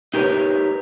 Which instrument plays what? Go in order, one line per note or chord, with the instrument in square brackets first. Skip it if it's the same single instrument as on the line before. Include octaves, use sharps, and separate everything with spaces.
[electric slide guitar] D#4 G4 A#4 B4 C#5